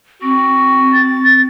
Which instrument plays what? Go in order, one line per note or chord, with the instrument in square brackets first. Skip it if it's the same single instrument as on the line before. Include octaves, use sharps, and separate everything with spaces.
[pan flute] C4 [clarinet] F#4
[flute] A6